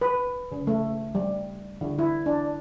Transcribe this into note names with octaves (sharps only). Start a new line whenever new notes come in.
B4
C#3
A3
G3
D3
E4
D4